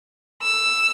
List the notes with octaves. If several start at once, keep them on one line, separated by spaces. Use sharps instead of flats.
E6